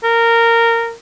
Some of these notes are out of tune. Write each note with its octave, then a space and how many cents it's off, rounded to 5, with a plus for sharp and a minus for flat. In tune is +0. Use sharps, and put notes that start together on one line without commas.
A#4 -15